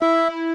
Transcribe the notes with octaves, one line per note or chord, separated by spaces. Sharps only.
E4 E5